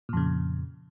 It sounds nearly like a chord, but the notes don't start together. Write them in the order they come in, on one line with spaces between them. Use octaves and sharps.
A#2 F2 C#3